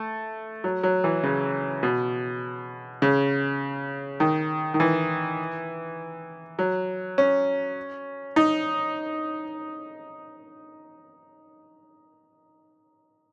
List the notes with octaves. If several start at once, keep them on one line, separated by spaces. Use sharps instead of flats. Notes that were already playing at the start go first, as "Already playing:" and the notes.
Already playing: A3
F#3
F#3
E3
C#3
B2
C#3
D#3
D#3
E3
F#3
C#4
D#4